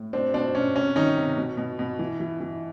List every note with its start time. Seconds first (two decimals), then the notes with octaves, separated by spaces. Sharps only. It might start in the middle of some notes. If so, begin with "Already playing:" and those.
Already playing: A2
0.13 B2 C4 D4
0.34 B2 C4 D4
0.55 B2 C#4
0.75 C3 C#4
0.96 D#3 C#4 D#4
1.17 C3
1.37 B2
1.57 B2
1.79 B2
1.99 E3
2.20 E3
2.40 E3